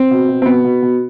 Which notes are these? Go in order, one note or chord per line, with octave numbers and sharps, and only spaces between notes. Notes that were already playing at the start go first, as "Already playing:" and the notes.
Already playing: C4
B2
B2
C4
B2 B3
B2
B2